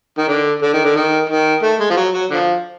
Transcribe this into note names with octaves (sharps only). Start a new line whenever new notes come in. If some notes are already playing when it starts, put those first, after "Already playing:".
D#3
D3
D3
D#3
D3
D#3
D#3
A3
G#3
F3
F#3
F#3
D3 F3